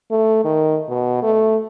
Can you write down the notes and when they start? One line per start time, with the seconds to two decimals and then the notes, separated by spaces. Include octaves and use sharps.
0.11 A3
0.45 D#3
0.89 B2
1.23 A3